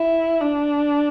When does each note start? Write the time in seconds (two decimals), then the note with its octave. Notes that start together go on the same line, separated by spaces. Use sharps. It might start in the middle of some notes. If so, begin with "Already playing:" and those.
Already playing: E4
0.41 D4